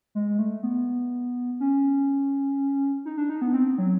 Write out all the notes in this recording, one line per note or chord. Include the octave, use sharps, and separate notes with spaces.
G#3
A3
B3
C#4
D#4
D4
D#4
B3
C4
F#3